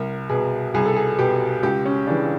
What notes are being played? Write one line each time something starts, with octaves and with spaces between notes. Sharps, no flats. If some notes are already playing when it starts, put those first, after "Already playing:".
Already playing: C2 A#4
B2 G#4
C2 G#4
A4
G#4
B2 G4
C#2 G4
C#4
C#3 E3 D4